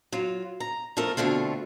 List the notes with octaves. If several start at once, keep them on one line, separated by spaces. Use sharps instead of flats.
F#3 F4
A#5
F3 A3 A4 A#4
B2 D3 A3 C4 F4